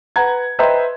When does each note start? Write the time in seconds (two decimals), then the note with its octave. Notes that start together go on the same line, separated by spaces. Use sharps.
0.16 B4 F#5 A#5 G#6
0.59 B4 C5 D#5 E5 G5 A#5